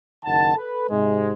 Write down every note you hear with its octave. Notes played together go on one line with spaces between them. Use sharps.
F#1 D#3 F#5 A5
A4 B4
G#2 C3 G#3